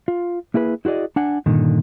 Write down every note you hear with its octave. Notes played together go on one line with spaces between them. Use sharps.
F4
A#3 E4 G#4 B4
E4 F#4 G#4 D5 D#5
D4 F#5 G#5
G2 A#2 D3 D#3